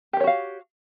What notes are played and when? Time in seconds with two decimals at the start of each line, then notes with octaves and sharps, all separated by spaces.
0.13 G4
0.17 A#4
0.20 C#5
0.24 F#4
0.27 F5